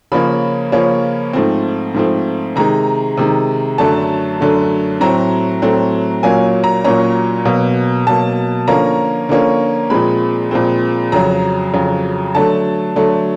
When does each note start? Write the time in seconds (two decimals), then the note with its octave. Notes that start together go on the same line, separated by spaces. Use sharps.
0.12 C#3 F3 A#3 C#4 B5
0.72 C#3 F3 A#3 C#4
1.33 G#2 F3 A3 C4
1.95 G#2 F3 A3 C4
2.56 C3 D#3 G#3 A#5
3.17 C3 D#3 G#3
3.78 F#2 D3 F#3 A3 A5
4.40 F#2 D3 F#3 A3
5.00 A2 F#3 A3 C4 A#5
5.62 A2 F#3 A3 C4
6.23 A#2 F#3 A#3 C#4 G#5
6.64 A#5
6.84 A#2 F#3 A#3 C#4 A#5
7.45 B2 F#3 A#3
8.07 B2 F#3 A#3 A5
8.68 D3 F3 A#3 C#4 A#5
9.29 D3 F3 A#3 C#4
9.90 A#2 F3 G#3 C4 B5
10.51 A#2 F3 G#3 C4
11.12 F2 C#3 F#3 A#5
11.73 F2 C#3 F#3
12.35 D3 F#3 A3 A5
12.96 D3 F#3 A3